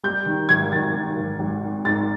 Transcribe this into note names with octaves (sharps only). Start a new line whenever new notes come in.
G3 G6
D#3
G#1 G#6
D#3 A6
D#3
G#1
G#1
D#3
G#2 A6